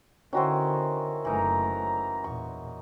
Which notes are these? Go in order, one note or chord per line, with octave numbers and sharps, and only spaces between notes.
D3 D#3 C#4 E4 F#4 C5
F#1 E3 A3 D#4 A#4 A#5
E2 A#2 C#6